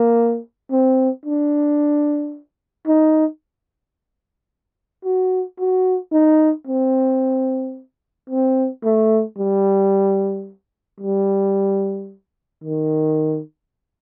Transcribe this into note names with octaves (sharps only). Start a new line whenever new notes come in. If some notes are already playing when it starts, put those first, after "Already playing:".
Already playing: A#3
C4
D4
D#4
F#4
F#4
D#4
C4
C4
A3
G3
G3
D#3